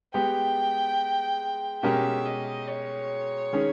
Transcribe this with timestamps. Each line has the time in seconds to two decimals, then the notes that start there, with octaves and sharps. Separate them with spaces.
0.14 G#3 B3 G4 G5
1.83 B2 G#3 C#4 G4 A#4 E5
2.25 D#5
2.68 C#5
3.53 D#3 G#3 C#4 G#4